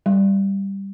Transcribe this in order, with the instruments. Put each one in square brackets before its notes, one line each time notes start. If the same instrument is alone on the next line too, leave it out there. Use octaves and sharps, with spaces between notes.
[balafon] G3